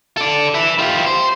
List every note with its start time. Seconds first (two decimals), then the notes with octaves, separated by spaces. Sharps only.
0.17 A4 D5
0.55 B4 E5
0.79 F4 G4
1.06 C5